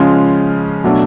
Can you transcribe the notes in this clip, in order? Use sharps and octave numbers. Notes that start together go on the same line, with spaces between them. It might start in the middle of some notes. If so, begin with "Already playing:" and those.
Already playing: C#3 F3 G#3 C#4 F4
B2 F#3 A3 D4